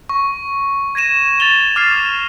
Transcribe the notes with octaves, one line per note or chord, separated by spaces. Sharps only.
C#6
G#6 A#6 D#7 E7
A6 F7 G7
D6 F6 G#6 A6 C7